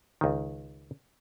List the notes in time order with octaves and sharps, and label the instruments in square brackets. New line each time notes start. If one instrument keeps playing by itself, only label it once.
[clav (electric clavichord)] C#2 D#3